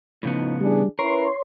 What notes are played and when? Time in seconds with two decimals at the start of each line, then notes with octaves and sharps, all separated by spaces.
0.23 A2 C#3 F3 B3 D#4
0.61 E3 G3 D4 G#4
0.99 C#4 E4 A#4 B4 C#5 C6